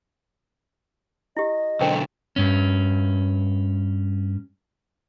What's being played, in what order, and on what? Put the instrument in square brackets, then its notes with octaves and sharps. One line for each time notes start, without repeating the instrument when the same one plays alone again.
[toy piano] E4 G4 [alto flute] D#5
[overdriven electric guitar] B1 D3 [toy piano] A#4 C5 G5
[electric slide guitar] G2 C#4